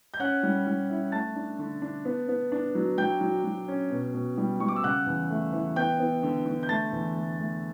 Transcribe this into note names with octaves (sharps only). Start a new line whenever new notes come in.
G6
C#4 F#5 F#6
G3
G3
E4
A3 A5 A6
D4
D3
D4
B3
B3
D4
F#3
F#3 G5 G6
F#3
F#3
C#4
B2
B2
G3
G3 C#6
D6
E6
C#3 F#5 F#6
E2
A3
E3
B3 G5 G6
B3
D3
D3
G6
A3 A5 A6
E2
A3
A3